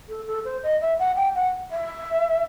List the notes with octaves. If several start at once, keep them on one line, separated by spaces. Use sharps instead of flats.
A4
A4
C5
D#5
E5
F#5
G5
F#5
E5